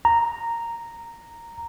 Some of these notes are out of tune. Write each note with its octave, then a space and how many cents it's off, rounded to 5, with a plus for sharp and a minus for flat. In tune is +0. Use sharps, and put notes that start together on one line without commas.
A#5 -5